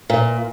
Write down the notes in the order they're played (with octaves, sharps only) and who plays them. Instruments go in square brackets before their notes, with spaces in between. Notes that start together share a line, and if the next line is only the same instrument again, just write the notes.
[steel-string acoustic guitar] A#2